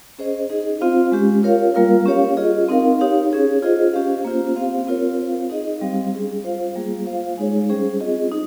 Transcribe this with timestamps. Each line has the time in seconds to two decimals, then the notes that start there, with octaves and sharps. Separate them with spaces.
0.19 C#4 G#4 C5 D#5
0.50 D#4 G#4 D#5
0.81 C4 F4 C5 F5
1.12 G#3 C#4 G4
1.43 F4 A#4 C#5 F5
1.74 G3 A#3 F4 A#4 F5
2.06 C#4 G4 C#5 F5
2.37 F4 G#4 D#5
2.68 C4 D#4 A#4 F5
3.00 D#4 G4 C#5 F5
3.31 C#4 G#4 C#5
3.62 F4 G#4 C5 D#5
3.93 C#4 G4 C5 F5
4.25 A#3 C#4 F4 C5
4.56 C4 G4 C5 F5
4.87 C4 F4 A#4 C#5
5.19 C4 F4 C5 F5
5.50 D#4 G#4 D#5
5.81 G3 C4 G4 C5 F5
6.12 G3 C#4 G#4
6.44 F4 C5 F5
6.75 G3 A#3 F4 G#4
7.06 F4 C5 F5
7.37 G#3 D#4 G#4 C#5
7.69 G3 C#4 G#4 C5
8.00 C4 F4 G#4 D#5
8.32 D#4